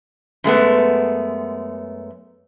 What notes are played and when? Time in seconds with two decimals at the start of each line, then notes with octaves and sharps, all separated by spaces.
0.44 F#2 G#3 A3 B3